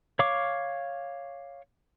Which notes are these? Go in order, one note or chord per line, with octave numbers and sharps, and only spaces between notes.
C#5 F5 C#6 D6